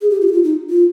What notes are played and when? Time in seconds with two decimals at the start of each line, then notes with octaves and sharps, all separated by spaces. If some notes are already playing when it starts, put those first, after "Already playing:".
0.01 G#4
0.10 G4
0.21 F4
0.27 G4
0.32 F4
0.44 D#4
0.70 F4